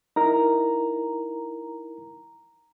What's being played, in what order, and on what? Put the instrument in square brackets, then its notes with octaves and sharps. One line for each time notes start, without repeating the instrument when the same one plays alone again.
[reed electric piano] D#4 E4 A#4 [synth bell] A#5